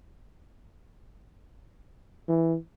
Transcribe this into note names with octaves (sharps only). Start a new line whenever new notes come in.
E3